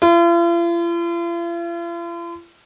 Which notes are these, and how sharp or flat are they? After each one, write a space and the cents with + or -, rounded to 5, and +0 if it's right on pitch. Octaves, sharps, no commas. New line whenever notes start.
F4 -45